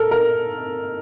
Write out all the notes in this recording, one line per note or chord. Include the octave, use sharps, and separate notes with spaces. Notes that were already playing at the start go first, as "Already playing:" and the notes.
Already playing: A4 A#4
A#4